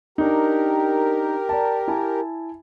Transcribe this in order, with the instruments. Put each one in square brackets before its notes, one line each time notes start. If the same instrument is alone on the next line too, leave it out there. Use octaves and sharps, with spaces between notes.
[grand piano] D4 D#4 [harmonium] G4 A#4
[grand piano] D5 A5
E4 G#5 A5